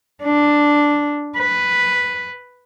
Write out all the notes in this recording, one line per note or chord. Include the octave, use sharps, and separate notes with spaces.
D4
B4